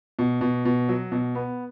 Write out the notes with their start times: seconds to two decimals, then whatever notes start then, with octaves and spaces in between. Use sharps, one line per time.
0.19 B2
0.41 B2
0.65 B2
0.89 F#3
1.12 B2
1.35 B3